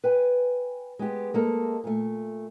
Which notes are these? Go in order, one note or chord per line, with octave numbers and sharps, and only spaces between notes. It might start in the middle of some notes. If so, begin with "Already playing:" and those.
B4 G5 G#5
G#3 B3 G4
G#3 A#3 A4
A#2 A3